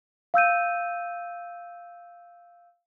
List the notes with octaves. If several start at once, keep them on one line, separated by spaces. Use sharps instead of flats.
F5 E6 G6 D#7